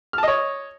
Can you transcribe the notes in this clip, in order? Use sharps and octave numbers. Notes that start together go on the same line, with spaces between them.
C#5 D#5 A5 F6